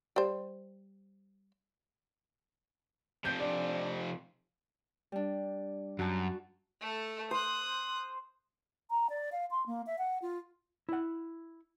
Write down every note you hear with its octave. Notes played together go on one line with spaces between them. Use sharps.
G3 C5
F2 C3 G6
D4
G3 D4
F#2 F#4 A5
A3 A4
C5 D#6 F#6
A#5
D5
F5
C6
A#3
E5
F#5
F4
E4 F#5